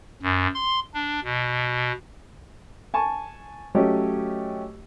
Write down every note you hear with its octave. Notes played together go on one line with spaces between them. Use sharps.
F#2
C6
D4
B2
G#5 A5 C#6
F#3 A3 C#4 G4 D#5